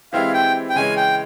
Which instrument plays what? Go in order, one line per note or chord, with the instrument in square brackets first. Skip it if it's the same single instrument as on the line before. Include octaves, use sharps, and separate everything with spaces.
[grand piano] E3 G#3 C4 E4 G4 [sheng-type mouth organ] F5
[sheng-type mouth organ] G5
G5
[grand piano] C#3 E3 G#3 C#4 [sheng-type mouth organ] G#5
[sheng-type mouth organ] G5